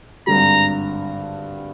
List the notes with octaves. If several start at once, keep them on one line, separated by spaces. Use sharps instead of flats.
G#1 G2 D3 G3 A#5